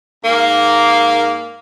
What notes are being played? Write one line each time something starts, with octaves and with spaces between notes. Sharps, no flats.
G#2 A#3